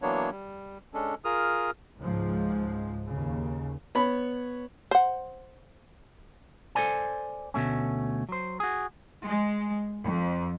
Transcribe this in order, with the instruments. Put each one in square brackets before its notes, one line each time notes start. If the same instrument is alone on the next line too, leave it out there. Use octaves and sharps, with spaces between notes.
[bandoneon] E3 F#3 A#3 B3 D4 C#5
G3
G#3 C#4 D4 A4
F4 G#4 A#4 D#6 F6
[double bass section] C#2 G#2 F3 G#3
D#2 C#3
[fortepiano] B3 C#5 B5
[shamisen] C5 F#5
[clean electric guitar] A4 B4 C5 D5 G#5
D2 B2 A3 C#4
F#3 C5
F#4 G#4
[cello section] G#3
F2